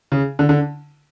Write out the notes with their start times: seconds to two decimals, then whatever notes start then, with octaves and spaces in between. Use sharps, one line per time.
0.12 C#3
0.39 D3
0.49 D3